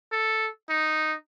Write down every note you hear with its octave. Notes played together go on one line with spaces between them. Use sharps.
A4
D#4